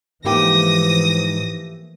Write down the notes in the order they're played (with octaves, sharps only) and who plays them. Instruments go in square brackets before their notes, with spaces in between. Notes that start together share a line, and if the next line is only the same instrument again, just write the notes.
[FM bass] G#2 [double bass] E3 F3 [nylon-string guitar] A3 A#3 G4 [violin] D#6 A#6